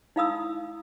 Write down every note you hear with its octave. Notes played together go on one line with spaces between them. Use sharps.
D#4 E4 F5 B5 D#6 E6